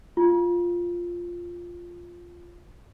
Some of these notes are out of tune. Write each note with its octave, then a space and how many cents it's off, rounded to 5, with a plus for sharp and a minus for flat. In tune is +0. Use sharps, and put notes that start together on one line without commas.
F4 +0